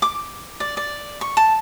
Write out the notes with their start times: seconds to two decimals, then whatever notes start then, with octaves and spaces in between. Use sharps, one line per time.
0.02 D6
0.60 D5
0.77 D5
1.21 C#6
1.37 A5